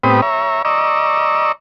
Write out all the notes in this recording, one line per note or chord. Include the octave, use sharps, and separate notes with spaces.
A2 B3 C4 G4 B5 D#6
C#5 E5 A#5
D5 D#5 A#5 C#6 E6